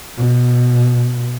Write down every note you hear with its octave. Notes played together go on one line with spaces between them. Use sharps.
B2